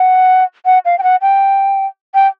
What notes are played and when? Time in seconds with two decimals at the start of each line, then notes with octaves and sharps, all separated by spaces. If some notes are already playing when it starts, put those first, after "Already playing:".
Already playing: F#5
0.66 F#5
0.85 F5
0.98 G5
1.03 F#5
1.22 G5
2.14 G5